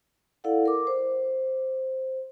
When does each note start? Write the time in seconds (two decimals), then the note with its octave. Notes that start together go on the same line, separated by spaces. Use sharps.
0.44 E4 A4 D5 F5 F#5
0.66 A#4 D6
0.87 C5